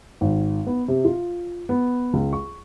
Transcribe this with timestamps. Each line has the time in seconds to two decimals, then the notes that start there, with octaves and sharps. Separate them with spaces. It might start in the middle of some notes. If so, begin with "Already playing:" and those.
0.21 G#1
0.67 B3
0.88 C3
1.05 F4
1.69 B3
2.13 C#2
2.33 C#6